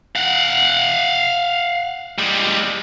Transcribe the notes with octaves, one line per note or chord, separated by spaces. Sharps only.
F5 F#5
G3 G#3